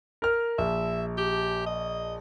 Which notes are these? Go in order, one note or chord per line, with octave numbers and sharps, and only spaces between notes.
A#4 F6
A#1 E5
G4
D#5